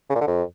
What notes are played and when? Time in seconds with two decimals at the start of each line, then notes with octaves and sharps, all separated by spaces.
0.09 C#3
0.15 A#2
0.21 D3
0.27 F2